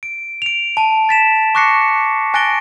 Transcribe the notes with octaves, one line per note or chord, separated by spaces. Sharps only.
D7
D7 F7
A5 D#7
A6 B6 E7
C#6 D6 F#6 A#6 C7 C#7
G#5 F#6 A6 A#6 D7 G7